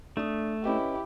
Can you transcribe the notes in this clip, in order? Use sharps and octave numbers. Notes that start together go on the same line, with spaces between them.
A3 D4 D#6
C#4 E4 G4 B4 D#5